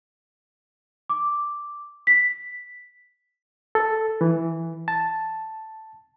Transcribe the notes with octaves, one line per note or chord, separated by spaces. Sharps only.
D6
B6
A4
E3
A5